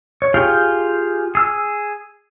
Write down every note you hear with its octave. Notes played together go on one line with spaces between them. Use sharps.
C#5
F4 G4 G#4 F5 G5
G#4 E6